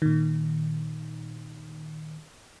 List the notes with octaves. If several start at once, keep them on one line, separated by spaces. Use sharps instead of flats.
A#2 D#3